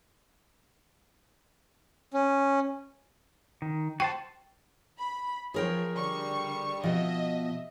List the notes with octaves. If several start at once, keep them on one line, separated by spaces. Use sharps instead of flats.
C#4
D#3
F#4 C5 G5 A5
B5
F3 G#4 A#4 C#5 G5
D3 G3 C#6
B2 F3 D#5 E5